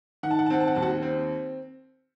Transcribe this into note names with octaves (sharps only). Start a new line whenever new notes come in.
D#3 F#5
A5
F#5
A5
C4 F#5
A5
F#5
D#2 A5
F#4 F#5
C4